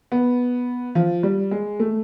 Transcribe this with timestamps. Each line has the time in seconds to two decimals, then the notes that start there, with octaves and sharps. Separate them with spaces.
0.12 B3
0.95 F3
1.23 G3
1.51 G#3
1.80 A3